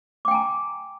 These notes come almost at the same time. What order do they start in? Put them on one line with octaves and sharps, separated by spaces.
D6 G5 G#5 A#5